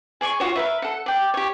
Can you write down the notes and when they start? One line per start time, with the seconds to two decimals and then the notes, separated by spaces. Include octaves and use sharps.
0.21 G#4 D5 G#5 C#6
0.40 F4 F#4 C#5
0.56 A#4 B4 E5
0.82 A4 F#5
1.06 D5 G5
1.34 G4 C#5